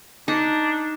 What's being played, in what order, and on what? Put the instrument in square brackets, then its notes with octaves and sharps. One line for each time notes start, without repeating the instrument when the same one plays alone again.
[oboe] D4 [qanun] D#4